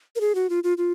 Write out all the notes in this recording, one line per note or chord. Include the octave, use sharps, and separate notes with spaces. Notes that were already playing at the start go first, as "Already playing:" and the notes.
A#4
G#4
F#4
F4
F4
F4